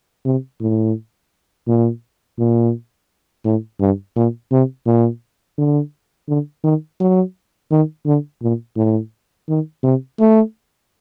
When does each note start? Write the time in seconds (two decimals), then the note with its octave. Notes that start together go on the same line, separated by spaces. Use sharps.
0.25 C3
0.61 A2
1.67 A#2
2.39 A#2
3.45 A2
3.80 G2
4.16 A#2
4.51 C3
4.86 A#2
5.58 D3
6.28 D3
6.63 D#3
7.00 F#3
7.71 D#3
8.05 D3
8.42 A#2
8.76 A2
9.49 D#3
9.83 C3
10.19 A3